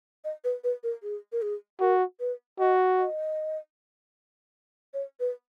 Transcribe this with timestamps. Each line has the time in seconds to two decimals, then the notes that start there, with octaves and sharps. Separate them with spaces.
0.25 D#5
0.44 B4
0.64 B4
0.83 A#4
1.03 G#4
1.32 A#4
1.42 G#4
1.81 F#4 A#4
2.20 B4
2.59 F#4 D#5
2.98 D#5
4.94 C#5
5.20 B4